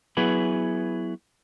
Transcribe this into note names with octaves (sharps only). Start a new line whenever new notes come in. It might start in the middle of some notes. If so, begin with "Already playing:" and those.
F#3 B3 E4 G#4 B4